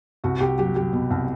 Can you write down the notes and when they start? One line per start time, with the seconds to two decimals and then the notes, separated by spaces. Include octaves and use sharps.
0.24 C2 F#4
0.40 C2 G4
0.58 F#3 G4
0.75 F#3 G4
0.93 B2
1.10 C2